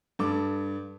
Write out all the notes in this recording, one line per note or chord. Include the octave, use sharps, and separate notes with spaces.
G2 A4 D6